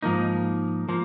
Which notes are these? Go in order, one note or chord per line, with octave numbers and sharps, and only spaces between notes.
G#2 F3 A#3 D#4
F3 A#3